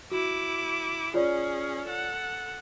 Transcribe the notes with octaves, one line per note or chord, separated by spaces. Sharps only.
E4 F#4 D6
C#4 F4 G#4 C#5 D5
A4 F#5